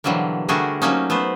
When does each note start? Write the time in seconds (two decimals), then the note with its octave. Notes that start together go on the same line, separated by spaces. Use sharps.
0.04 B2 D3 E3 F#3 G3 A#3
0.48 D3 G3 A3 F#4 G#4 A#4
0.82 F#3 A3 A#3 C#4 D#4
1.10 A3 B3 B4 C5